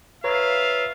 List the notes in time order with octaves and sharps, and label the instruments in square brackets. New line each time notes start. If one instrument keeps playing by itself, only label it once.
[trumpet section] F4 E5 F5 [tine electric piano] B4 C#5 A#5